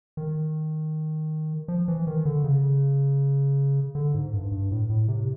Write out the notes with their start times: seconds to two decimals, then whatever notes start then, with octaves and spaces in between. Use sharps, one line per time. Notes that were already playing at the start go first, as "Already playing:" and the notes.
0.17 D#3
1.68 F3
1.88 E3
2.07 D#3
2.25 D3
2.44 C#3
3.95 D3
4.15 G#2
4.34 G2
4.52 G2
4.71 A2
4.90 A2
5.08 C3